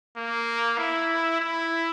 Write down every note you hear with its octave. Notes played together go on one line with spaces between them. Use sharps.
A#3
E4
E4